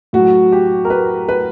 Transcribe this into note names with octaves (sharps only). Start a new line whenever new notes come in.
A2 F#3 F#4
G4
A#4
B4
B4